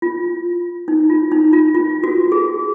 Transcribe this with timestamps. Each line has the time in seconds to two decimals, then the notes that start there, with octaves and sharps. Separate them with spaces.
0.02 F4
0.88 D#4
1.10 F4
1.32 D#4
1.53 F4
1.75 F4
2.04 F#4
2.32 G#4